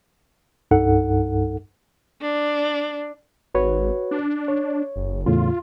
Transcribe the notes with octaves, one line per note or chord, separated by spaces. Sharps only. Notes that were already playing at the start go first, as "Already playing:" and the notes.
C2 G2 D#4 A4 F#5
D4
G#1 F#4 B4 C#5
D4
C#5
F#1
E2 A2 C#3 F4